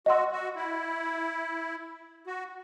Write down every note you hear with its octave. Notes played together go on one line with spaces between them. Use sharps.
F#4 D#5 F#5 C6 E6
F#4
E4
F#4